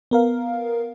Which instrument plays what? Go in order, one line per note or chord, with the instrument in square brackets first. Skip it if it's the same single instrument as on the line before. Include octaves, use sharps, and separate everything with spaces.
[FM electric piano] B3 A#4 F5